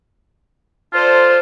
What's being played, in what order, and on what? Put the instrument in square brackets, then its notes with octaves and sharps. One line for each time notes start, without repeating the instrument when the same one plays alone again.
[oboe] F4 [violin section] A4 C5 D5